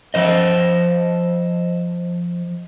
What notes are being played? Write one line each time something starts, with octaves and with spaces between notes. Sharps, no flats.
F3 C5 D#5